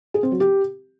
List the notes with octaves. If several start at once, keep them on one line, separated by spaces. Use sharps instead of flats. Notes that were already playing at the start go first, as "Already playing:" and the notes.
G#4
C4
F#3
G4